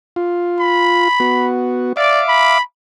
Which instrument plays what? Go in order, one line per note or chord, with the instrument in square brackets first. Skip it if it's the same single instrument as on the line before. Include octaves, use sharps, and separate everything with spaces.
[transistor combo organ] F4
[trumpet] B5
[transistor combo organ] B3 F#4
[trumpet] D5 [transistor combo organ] E5 F5 D6
[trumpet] B5